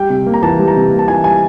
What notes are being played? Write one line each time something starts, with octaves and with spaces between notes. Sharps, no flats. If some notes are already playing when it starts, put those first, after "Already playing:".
Already playing: G3 G5
C3
A#3
A#5
E3 A5
G3
A#5
C3
A#3
A5
E3 G#5
G3 G#5